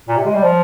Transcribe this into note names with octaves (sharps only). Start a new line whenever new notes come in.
A#2
C3
G#3
G3
F3